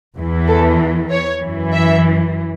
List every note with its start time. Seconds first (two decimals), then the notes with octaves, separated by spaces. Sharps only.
0.16 E2 E3
0.47 A4
1.10 C#5
1.41 F#2 E3
1.72 E5